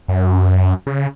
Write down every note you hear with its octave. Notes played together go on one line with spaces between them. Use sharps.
F#2
C#3